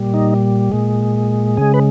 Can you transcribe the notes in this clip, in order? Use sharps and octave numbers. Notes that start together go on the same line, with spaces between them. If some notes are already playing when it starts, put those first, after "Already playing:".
Already playing: A#2 G3
D#4
A#2 G#3
C#3 G#3 G#4
B4